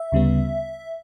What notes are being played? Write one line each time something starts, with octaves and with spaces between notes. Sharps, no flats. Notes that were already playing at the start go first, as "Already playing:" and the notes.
Already playing: E5
D2 C#3 G3 B3